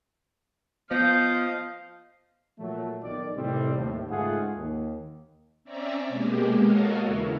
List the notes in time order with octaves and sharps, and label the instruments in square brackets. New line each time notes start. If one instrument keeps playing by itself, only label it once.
[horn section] F3 D#5 [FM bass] B3 [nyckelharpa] F5 [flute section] G6
[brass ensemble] A#2 F3 F#3 A3
B1 D#3 D5
A2 C3 D#3 G3 C4
D#2 A2
C#2 G#2 A3 F4 G#4 F#5
D#2
[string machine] C4 C#4 D5 E5 A#5
B2 G#3 A#3 G4
F#4 A4 A#4 C#5 D#5 F5
E2 C#3 E4